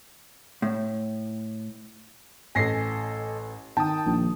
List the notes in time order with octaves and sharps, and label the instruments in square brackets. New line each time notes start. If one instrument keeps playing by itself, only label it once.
[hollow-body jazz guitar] A2
[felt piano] A1 A#6 C7 [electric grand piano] A4 D#5 G#5
[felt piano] D#3 A5 [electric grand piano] G5 D#6
[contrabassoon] A#1